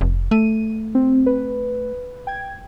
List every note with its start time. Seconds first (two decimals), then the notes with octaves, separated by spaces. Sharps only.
0.01 F1
0.31 A3 D#7
0.95 C4
1.26 B4
2.27 G5 G#6